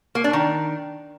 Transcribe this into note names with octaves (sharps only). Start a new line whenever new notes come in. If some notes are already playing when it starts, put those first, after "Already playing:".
A#3
D4
D#3